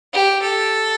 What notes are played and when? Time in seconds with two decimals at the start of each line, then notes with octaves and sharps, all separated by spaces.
0.13 G4
0.42 A4